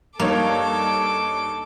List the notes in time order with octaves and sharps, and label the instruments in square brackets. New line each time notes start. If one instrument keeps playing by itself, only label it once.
[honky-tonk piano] G2 D#4 C#5 [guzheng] A#3 [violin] A4 D6